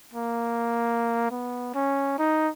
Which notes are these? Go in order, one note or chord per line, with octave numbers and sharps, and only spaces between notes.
A#3
B3
C#4
D#4